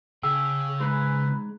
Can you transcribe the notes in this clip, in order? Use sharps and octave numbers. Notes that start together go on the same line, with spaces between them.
C#3 G#4 G5 E6
G#3 D#4 G#4 B4